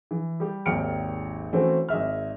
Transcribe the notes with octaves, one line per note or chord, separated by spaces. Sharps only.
E3
G3 G4
G#1 D#2 G5 F6 C#7 D7
E3 A3 C4 C#4 F#4
G#1 D#5 E5 F6